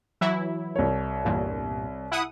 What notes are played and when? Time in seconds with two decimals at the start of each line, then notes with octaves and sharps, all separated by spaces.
0.21 E3 F#3 E4
0.76 C2 C#5
1.25 E2 G2 A#2
2.11 E4 F#5 D#6